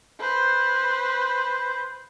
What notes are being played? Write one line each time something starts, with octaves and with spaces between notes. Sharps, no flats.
B4 C5